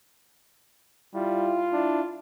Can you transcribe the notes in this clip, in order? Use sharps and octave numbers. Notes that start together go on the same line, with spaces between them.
G3 E4 F4
D4 E4